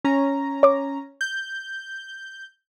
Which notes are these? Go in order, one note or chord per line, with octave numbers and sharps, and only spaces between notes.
C#4 A#5
C#5 D6
G6